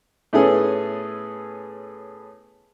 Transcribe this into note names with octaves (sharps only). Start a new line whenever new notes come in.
A2 B3 C#4 G#4 A4